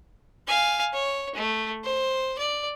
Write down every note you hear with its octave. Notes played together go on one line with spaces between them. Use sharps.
F5 G#5
C#5
A3
C5
D5